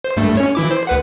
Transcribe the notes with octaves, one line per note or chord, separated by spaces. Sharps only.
C5
G2 A3
C#4 C#5
E3 E4 D6
C5
D2 B4 F#5